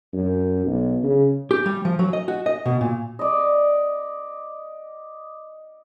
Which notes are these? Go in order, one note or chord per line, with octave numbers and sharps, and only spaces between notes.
F#2
B1
C#3
G4
G3
F3
F#3
D#5
F#4
D#5
B2
A#2
D5 D#5